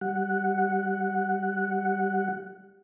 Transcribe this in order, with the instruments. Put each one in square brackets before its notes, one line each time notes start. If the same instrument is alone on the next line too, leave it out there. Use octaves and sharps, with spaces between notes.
[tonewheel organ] G3 F#5